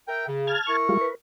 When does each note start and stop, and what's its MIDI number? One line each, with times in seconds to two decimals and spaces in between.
0.08 0.26 70
0.08 0.26 76
0.08 0.26 79
0.28 0.54 49
0.47 0.77 81
0.47 0.77 89
0.47 0.77 92
0.67 1.07 64
0.67 1.07 70
0.67 1.07 85
0.89 0.97 55
0.89 0.97 56
0.89 0.97 65
1.01 1.15 71